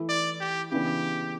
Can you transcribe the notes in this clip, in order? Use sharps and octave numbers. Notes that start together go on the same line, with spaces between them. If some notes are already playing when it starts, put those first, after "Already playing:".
Already playing: E3 A3 E4
D5
G4
C#3 E3 B3 D4 G4